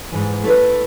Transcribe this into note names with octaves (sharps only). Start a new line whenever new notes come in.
G#2 E3
A3 E4 B4